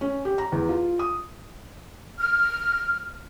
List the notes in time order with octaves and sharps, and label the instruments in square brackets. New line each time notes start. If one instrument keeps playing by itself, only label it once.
[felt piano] C#4
G4
A#5
E2
F4
D#6
[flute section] F6